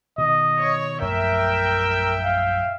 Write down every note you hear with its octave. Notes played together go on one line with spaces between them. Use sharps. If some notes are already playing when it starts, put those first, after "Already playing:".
B2 D#3 D#5
C#5
A#1 F#2 A3 A#4 E5 G5
F5